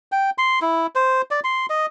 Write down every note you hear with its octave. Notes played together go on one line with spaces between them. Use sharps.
G5
C6
E4
C5
D5
C6
D#5